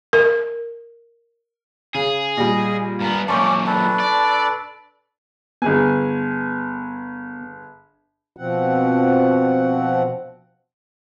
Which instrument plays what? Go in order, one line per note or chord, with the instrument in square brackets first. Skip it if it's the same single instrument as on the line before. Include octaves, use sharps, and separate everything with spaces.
[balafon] A#4
[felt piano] C#3 [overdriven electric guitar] G#4
[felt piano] A#2 G3 [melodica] D#5
[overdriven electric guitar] G2 B3 [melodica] A#4
[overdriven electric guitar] F#2 A#2 [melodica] C#4 D5 [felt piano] A5 C#6 G6
[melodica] D4 A4 B4
[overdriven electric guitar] D5
[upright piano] G1 G#4 G#5 [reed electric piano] B3
[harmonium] B2 F3 C4 F#5